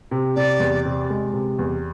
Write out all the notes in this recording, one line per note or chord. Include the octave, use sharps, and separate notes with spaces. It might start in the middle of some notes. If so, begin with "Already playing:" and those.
C3
C3 D5
E2
C3
G#3
C3
E2